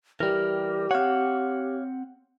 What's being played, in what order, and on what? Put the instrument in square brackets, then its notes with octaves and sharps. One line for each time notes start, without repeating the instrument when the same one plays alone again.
[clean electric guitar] E3 G3 [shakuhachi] G4 [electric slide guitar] A#4
[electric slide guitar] C4 F#5 [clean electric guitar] C#5 F5